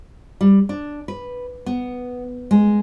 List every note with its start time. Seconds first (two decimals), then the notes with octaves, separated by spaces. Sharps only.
0.41 G3
0.69 D4
1.08 B4
1.66 B3
2.51 G#3